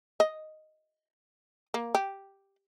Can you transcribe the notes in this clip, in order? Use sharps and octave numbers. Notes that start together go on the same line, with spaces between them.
D#5
A#3
G4